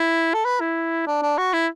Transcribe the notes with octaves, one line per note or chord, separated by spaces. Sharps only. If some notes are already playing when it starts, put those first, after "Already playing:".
Already playing: E4
A4
B4
E4
D4
D4
F#4
E4